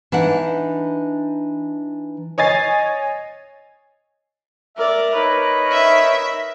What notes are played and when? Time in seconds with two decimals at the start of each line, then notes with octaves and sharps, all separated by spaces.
0.12 E3 D4 D#4 E5 F#5
2.38 C#5 D#5 G#5 A6 C7
4.77 A#4 D5 E5
5.14 D#4 A#4 B4 C#5
5.71 E5